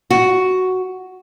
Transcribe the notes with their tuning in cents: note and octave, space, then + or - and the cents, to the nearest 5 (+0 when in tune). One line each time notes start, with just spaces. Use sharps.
F#4 +5